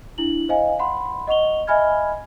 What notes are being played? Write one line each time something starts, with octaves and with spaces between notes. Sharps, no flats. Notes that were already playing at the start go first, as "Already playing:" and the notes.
D4 E4 F#7
C5 D#5 F5 G#5
F#5 B5 C6
D#5 F#5 C#6 F7 G7
D#5 E5 G#5 B5 F6 G#6